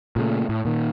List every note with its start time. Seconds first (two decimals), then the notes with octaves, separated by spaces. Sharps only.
0.16 A#2 C#3 A3
0.49 A2
0.65 A#2 D#3